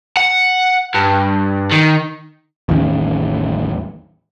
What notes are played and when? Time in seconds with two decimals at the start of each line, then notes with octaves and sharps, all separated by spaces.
0.17 F#5
0.94 G2
1.71 D#3
2.69 A1 E2 D#3 C#4